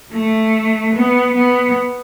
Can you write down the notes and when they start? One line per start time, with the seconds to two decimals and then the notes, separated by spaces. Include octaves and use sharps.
0.13 A3
0.94 B3
1.36 B3